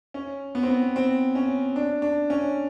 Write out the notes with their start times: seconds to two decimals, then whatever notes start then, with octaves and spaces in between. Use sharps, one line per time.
0.14 C#4
0.55 B3
0.63 C4
0.70 B3
0.96 C4
1.35 C#4
1.76 D4
2.02 D4
2.30 C#4